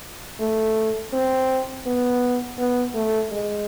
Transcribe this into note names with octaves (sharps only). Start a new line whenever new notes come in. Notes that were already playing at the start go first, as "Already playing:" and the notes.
A3
C4
B3
B3
A3
G#3